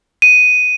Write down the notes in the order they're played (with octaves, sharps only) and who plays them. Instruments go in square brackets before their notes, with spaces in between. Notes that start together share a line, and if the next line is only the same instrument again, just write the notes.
[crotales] D#7